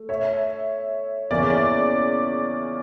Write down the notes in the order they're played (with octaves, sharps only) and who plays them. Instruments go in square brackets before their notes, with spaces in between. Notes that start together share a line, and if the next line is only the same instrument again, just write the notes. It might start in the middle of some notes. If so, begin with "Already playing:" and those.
Already playing: [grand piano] A3
[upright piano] C#5 E5
[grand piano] E2 C#3 E3 A#3 C#4 [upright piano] D5
[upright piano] D5